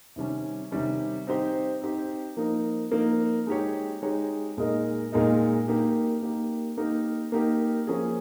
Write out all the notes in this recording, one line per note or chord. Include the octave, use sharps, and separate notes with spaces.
C3 D#3 G3 C#4
C3 D#3 G3 C#4
C4 D#4 G4 C5
C4 D#4 G4 C5
F3 A#3 D#4 A#4
F3 A#3 D#4 A#4
G#3 D#4 G4 C#5
G#3 D#4 G4 C#5
A#2 G#3 D#4 A#4 D#5
A#2 G#3 D#4 A#4 D#5
A#3 D#4 G4
A#3 D#4 G4
A#3 D#4 G4 A#4
A#3 D#4 G4 A#4
F3 A#3 C#4 G#4